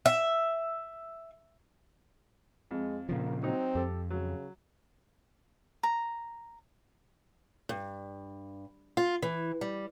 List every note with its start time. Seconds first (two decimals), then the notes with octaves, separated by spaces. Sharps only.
0.06 E5
2.71 F2 G#3
3.09 A#2 C#3 F3 A#3
3.43 F#3 C4 D#4
3.75 F2 G4 A4
4.10 C#3 F#3
5.83 A#5
7.69 G2
8.97 F4
9.22 E3
9.61 G3